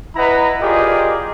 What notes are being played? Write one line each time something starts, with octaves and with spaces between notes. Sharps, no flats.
E4 B4 D#5 F#5 A#5
F4 G4 G#4 A#4 D5 D#5